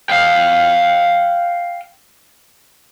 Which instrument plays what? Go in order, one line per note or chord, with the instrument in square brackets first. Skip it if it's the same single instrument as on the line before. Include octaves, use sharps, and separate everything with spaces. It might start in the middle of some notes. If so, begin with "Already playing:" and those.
[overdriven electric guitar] F5 G5